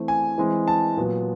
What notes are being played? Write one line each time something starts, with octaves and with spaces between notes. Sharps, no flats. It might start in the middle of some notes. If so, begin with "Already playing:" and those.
Already playing: E3 A3 C4
G#5
E3 G#3 C4
A5
A#2 F#3 B3